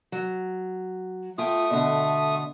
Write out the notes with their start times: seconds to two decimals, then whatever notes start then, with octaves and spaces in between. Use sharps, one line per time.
0.12 F#3
1.38 A3 F4 G5 D#6
1.70 B2 D3